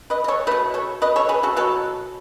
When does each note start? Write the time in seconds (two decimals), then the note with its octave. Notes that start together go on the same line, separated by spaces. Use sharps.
0.10 B4 D#5
0.24 D#5
0.28 A4 C#5
0.47 A3 B4 D#5
0.51 B2
0.74 A4 C#5
1.02 B4 D#5
1.16 A4 C#5
1.29 G#4 B4
1.43 F#4 A4
1.56 B2 F#3 B3 F#4 A4